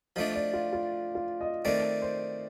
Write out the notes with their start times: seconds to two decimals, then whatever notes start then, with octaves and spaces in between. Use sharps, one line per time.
0.16 F3 A3 D4 D#5
0.35 D5
0.53 F4
0.73 F4
1.15 F4
1.41 D#5
1.65 D#3 A3 C4 D5
2.02 C5